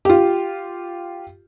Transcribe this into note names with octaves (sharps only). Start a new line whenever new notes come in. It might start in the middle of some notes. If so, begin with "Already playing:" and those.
F4 G4